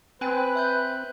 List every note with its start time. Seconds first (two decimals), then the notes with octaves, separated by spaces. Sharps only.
0.21 C4 B4 G5 G#5 F#6
0.55 E5 F#6 G6